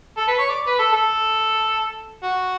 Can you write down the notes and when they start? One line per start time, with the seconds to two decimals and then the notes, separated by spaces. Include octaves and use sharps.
0.17 A4
0.28 B4
0.39 C#5
0.50 D5
0.68 B4
0.79 A4
0.93 A4
2.23 F#4